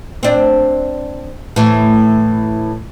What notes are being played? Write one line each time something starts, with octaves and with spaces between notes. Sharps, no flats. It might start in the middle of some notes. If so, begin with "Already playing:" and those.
C4 D4
A2 E3